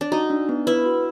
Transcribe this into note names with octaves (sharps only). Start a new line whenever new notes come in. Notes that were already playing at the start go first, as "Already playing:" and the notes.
D4
D#4 F#4
D4
B3
E4 B4
F#4